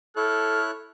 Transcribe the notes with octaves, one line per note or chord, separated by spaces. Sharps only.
E4 A4 C#5 F6 F#6